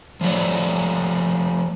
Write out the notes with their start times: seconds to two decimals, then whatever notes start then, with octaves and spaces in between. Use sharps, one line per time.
0.21 F3 A3 C#5 D5